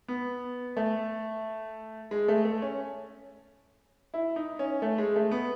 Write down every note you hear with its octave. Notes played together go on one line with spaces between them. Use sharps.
B3
A3
G#3
A3
A3
C#4
E4
D#4
C#4
A3
G#3
A3
B3